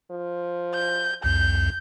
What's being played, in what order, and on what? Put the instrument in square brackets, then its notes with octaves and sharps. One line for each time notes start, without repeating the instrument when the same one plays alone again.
[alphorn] F3
[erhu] G6
[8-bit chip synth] C2 F2 [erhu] G6